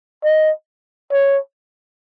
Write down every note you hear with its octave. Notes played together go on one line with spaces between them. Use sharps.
D#5
C#5